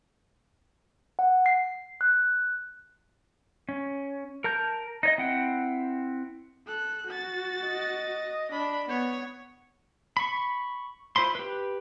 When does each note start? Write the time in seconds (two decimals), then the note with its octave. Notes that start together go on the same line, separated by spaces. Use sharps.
1.19 F#5
1.46 C7
2.01 F#6
3.69 C#4
4.44 A#4 A5 A#5 G6
5.03 D#4 C#5 D#5
5.18 C4 E4 F#5 G5
6.67 A4 F#6
7.07 F#4 A6
7.66 D#5
8.52 D4 B5
8.89 B3 C#5
10.17 B5 C#6
11.16 E4 F4 C5 B5 C6
11.35 G4 B4